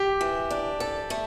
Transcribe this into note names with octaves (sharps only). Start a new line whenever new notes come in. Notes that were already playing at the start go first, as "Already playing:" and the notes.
Already playing: G4
E3
D4
A4
A3